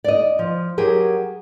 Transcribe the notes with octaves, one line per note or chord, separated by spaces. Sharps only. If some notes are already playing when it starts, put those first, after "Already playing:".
D5 D#5
F3
F#3 G4 G#4 A#4